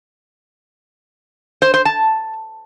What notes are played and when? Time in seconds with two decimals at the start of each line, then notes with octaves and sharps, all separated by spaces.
1.62 C5
1.74 C5
1.85 A5